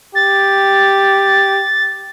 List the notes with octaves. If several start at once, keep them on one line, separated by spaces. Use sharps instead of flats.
G4 A6